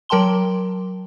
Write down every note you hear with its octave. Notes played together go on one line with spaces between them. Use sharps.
F#3 A#4 G5 A5 C6 G7